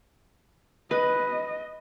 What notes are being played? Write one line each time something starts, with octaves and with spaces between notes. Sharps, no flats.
B4 D#5